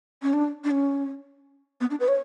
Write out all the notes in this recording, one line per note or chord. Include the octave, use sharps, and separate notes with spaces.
C#4
D4
D4
C#4
B3
D4
B4
C#5